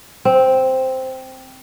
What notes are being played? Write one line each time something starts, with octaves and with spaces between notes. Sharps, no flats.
C4